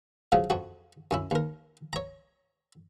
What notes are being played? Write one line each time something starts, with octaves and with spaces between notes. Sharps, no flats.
A2 C#3 F3 F#3
F2 F#4
F#2 C#4 E4
D#2 A#4
C#5 A#5